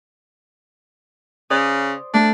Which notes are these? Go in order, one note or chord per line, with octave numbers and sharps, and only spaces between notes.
C#3 C5 D5 D#6
A3 D4 A4